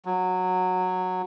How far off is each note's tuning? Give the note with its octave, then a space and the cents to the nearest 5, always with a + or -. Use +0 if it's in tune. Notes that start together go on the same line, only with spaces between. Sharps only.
F#3 -10